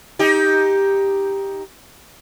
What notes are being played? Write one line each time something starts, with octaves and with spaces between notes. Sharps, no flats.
D#4 G4